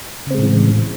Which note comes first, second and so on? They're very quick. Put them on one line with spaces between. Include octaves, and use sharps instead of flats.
C#3 C4 G#3 A2 E3